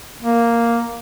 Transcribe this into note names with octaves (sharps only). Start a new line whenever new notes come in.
A#3